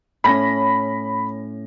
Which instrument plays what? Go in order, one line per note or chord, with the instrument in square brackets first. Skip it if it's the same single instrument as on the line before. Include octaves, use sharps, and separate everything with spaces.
[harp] A2 C#4 [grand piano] B5 A#6